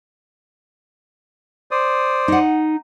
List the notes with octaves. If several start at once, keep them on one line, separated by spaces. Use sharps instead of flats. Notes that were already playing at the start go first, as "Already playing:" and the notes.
C5 D5 D#6
D#4 F#5